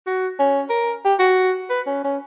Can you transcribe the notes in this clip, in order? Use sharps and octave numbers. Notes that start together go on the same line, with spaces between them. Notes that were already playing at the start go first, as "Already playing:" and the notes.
F#4
C#4
A#4
G4
F#4
B4
C#4
C#4